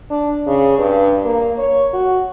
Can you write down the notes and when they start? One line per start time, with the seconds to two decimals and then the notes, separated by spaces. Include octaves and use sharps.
0.10 D4
0.47 C#3
0.78 G2
1.25 A#3
1.58 C#5
1.94 F#4